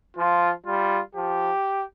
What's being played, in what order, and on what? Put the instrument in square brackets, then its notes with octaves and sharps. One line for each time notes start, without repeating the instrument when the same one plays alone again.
[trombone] F3 [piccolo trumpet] F4
[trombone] G3 [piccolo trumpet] F4
[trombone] F3 [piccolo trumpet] G4